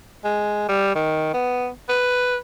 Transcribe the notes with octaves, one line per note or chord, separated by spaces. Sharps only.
G#3
G3
D#3
B3
B4